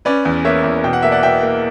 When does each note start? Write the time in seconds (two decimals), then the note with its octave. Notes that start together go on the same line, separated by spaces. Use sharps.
0.05 C#4 B4 D5
0.25 E2
0.45 A#3 C#5 E5
0.64 E2
0.84 B2 G5
0.93 F#5
1.03 A#3 E5
1.12 D5 F#5
1.23 B2 E5 G5
1.43 A#3